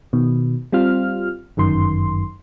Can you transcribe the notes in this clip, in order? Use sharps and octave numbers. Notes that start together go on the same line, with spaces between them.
B2 D#3
G3 C4 F4 F6
G1 F#2 D#3 C6